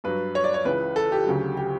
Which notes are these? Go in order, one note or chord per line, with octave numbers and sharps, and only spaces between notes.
G2 F#3 B4
C#5
D5
C#5
C#2 C#3 E3 B4
A4
G4
D2 C#3 F#3
G4